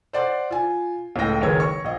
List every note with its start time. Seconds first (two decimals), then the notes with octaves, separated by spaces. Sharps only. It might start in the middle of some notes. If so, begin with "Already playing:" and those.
0.13 C5 D5 F#5 C6
0.51 F4 G#5
1.16 C#2 A2 A3 G5 A#6
1.42 F#1 D#3 G#3 B4 C#5 G#6
1.60 C#5 C#6
1.84 A#1 D#5